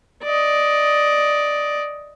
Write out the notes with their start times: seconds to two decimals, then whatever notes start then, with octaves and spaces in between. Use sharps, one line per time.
0.23 D5 D#5